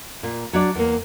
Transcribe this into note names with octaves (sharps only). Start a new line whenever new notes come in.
A#2
F#3 D4 D5
E2 A#3